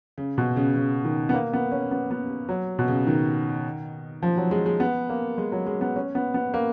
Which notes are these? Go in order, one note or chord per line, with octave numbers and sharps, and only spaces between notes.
C#3
B2
C#3
C#3
D#3
B3
A#3
B3
C#4
B3
B3
F#3
B2
C#3
D#3
F3
F#3
G#3
G#3
B3
A#3
G#3
F#3
G#3
B3
C#4
B3
B3
A#3